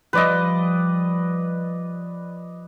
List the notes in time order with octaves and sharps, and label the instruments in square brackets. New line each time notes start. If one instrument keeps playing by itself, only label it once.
[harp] F3 G3 [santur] B4 D5 D#5